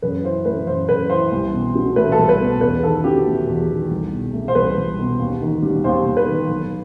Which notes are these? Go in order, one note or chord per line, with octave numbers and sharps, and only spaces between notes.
F#2 B4
E3 C5
A3 B4
F#2 C5
F#2 B4
E3 C5
C2
B2
F#3
A3 B4
A4
C2
B4
B2
E2 B4
D#3 A4
F#3 G4
A3
E2
D#3
C2
B2
A3
C5
C2 B4
C2
B2
D#2
D#3
G3
D#2 C5
D#2
B4
D#3
B1